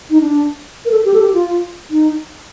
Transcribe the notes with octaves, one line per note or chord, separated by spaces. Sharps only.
D#4
D4
A#4
A4
G4
A4
G4
F4
D#4